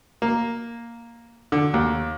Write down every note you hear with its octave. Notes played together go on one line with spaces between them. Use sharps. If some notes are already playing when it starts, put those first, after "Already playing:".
A#3
D3
D#2